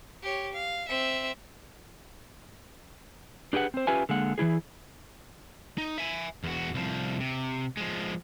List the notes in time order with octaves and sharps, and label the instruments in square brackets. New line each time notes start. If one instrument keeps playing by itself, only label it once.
[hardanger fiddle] G4 C#5
F5
C4 E5
[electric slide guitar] D4 G4 G#4 B4 F#5
C4 C5
C#4 F4 G4 B4 E5 G#5
D3 G#3 A#3 F#5
E3 G#3 E4 G#4
[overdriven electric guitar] D#4
E5 G#5
E2 F#4
C2 F3
C3
F3 G#3